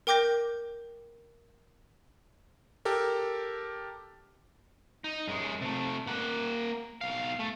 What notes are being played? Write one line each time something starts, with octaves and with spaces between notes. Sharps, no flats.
A#4 G5 D6 G6 A#6
G4 A4 A#4
D#4
F#2 G#3
C3 A3
A#3 F#5
B1 F5
A3